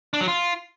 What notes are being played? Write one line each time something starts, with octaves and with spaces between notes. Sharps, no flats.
D4
F#3
F4